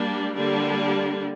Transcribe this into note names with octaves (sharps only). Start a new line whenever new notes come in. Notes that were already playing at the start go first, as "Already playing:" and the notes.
Already playing: G3 A#3 D4
D3 G3 A#3 D4